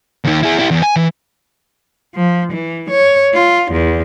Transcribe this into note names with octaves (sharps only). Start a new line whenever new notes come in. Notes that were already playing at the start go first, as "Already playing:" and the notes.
D#2 D#3
E4 G#4
E4 G4
E2
G#5
E3
F3
E3
C#5
F4
E2